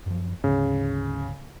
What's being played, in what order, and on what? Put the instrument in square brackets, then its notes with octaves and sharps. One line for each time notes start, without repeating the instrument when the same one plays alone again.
[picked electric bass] F#2 F3
[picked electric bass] D2 G#2 [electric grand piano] C#3